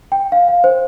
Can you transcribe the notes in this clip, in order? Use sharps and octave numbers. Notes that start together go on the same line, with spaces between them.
G5
F5
F5
C5